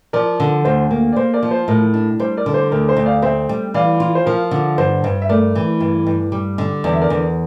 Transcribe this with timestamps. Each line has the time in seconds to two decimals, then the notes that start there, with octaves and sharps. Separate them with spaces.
0.13 F3 A#4 D5
0.40 D3
0.65 D2 C5
0.91 A#3
1.13 D5
1.16 A#3 C5
1.34 A#4 D5
1.43 F3
1.51 C5
1.68 A2 A#4
1.94 D4
2.20 G3 C5
2.37 A#4 D5
2.46 D3
2.54 C5
2.72 D2 A#4
2.89 C5
2.97 D2
3.06 D5 F5
3.22 C4 C5 E5
3.49 G3
3.74 E3 D5 F5
4.00 F4
4.15 C5
4.26 F3 A#4
4.51 D3
4.78 G2 C5
5.04 G2
5.22 E5
5.29 A3 A#4 D5
5.55 E3
5.80 G2
6.07 G2
6.32 G3
6.58 D3
6.84 E2 D5
6.93 E5
7.01 A#4 D5
7.10 E2